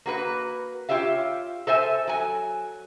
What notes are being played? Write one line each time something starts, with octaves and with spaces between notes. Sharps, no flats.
A#3 F#4 B4
F4 G4 C#5 E5 F5
A4 C5 E5 G#5
F#3 G#5